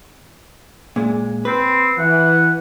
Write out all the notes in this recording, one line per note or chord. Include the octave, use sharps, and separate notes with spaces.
A#2 G#3
C4 B4
E3 F#5